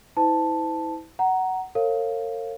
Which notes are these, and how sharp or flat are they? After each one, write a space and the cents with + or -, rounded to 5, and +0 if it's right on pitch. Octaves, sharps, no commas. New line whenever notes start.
E4 -30 C5 -40 A5 +0
F#5 +15 A#5 +0
A#4 -45 C#5 -40 F5 +0